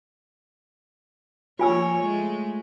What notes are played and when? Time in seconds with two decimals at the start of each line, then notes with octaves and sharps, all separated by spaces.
1.59 F3 A#3 F4 C#5 G#5 E6
2.02 G#3 A3